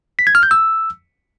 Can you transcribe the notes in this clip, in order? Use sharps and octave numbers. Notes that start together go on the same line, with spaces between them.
B6
G#6
F6
G6
E6